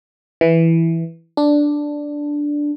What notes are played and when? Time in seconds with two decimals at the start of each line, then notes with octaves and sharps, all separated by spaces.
0.41 E3
1.37 D4